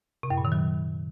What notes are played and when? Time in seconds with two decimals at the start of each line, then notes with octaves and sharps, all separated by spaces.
0.23 C3
0.30 F#2
0.38 A#2
0.45 D#3
0.52 F#3